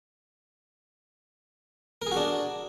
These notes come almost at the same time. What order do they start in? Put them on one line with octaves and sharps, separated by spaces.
A#4 G#4 F#4 D4